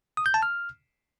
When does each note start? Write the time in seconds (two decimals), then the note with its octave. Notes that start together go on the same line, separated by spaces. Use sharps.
0.17 D#6
0.26 G6
0.34 A5
0.43 F6